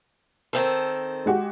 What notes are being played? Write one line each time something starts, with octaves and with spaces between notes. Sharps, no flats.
D#3 C4 A4
G#3 F#4 G4